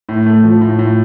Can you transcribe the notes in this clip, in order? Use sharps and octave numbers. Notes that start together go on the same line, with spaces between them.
A2
A3
F3
A2
A2